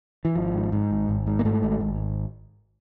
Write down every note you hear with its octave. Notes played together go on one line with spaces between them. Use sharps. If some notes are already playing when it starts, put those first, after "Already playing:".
E3
G#1 F3
G#2
G#2
G#1
G#1
G#2
A#3
G#2 A3
G#1
G#1